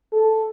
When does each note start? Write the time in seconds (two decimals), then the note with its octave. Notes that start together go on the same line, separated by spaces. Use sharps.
0.13 A4